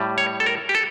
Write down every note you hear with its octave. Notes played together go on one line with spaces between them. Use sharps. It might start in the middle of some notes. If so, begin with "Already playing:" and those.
Already playing: A2 G3
C#5
A4
A#4
G4
A4